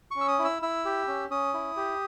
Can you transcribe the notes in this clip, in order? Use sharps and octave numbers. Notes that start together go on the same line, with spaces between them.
C#4 C#6
E6
D#6
E4
E6
E4 E6
G4
C#4
C#4 D#6
E4
G4